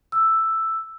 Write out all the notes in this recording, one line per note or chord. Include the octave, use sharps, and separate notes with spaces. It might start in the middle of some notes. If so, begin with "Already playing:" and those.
E6